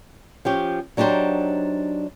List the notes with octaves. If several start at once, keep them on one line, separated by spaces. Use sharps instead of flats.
F3 C#4 G4
F#3 D4 D#4 G4 C5